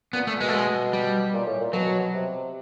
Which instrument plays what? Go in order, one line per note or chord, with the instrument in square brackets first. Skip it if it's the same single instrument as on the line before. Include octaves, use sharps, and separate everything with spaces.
[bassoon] A#2 [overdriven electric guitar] B3
[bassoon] A#2 [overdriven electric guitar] A3
[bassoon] B2 [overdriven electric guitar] G#3
[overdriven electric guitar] A3
G#3
G3
[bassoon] A#2
A2
A#2
[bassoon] B2 [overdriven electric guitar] F#3
[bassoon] C3